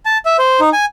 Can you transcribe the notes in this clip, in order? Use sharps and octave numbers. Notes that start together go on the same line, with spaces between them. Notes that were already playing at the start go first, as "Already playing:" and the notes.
A5
E5
C5
D#4
G#5